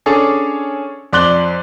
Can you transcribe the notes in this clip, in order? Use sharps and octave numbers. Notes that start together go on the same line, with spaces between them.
C#4 D4 G#4 A4 C#5
F2 D5 C6 F#6 F#7 G7